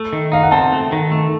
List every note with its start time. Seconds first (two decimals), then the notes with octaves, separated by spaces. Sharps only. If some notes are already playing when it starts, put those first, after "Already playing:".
Already playing: A3
0.13 D#3
0.32 D#4 F5
0.43 F#5
0.51 C4 A5
0.72 A3
0.92 D#3
1.12 A3